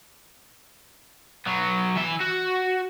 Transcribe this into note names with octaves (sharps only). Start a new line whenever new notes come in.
F#3 B3
E3 E5
F#4